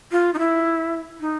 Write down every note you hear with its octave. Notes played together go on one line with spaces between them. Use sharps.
F4
D#4
E4
D#4